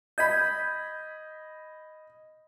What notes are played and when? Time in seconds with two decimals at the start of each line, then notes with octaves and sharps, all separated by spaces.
0.18 D#5 B5 G6 G#6 B6